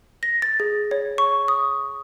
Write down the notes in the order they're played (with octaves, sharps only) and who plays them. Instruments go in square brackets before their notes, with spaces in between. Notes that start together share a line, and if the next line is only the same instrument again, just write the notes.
[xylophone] A#6
A6
G#4
C#5
C#6
D#6